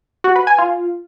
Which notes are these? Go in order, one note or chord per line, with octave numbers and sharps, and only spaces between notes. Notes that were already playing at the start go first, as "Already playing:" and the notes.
F#4
B4
G#5
F4